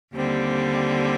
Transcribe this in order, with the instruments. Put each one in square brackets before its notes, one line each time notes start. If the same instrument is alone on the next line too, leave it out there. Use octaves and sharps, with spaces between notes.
[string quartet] D#2 D3 G3 C4